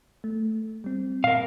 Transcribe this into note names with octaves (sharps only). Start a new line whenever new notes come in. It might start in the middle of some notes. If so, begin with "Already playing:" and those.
A3
G3 C4
A#2 A#4 F5